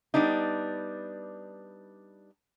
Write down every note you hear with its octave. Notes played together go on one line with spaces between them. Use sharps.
G3 B3 D4 D#4